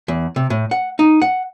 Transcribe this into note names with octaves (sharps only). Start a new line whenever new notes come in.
E2
C3
A2
F#5
D#4
F#5